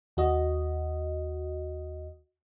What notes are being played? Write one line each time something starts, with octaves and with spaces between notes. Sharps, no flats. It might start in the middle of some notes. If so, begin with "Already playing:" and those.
D#2 F#4 D#5